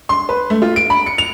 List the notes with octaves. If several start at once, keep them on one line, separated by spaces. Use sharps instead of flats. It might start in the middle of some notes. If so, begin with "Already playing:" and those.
C6
B4
A3
F4
D7
B5
C#7
F7